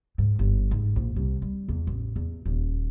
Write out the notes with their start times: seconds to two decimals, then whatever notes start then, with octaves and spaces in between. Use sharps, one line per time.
0.18 G#2
0.39 G1
0.71 G#2
0.96 A#1
1.16 C2
1.42 G3
1.68 E2
1.87 A1
2.16 E2
2.45 D#1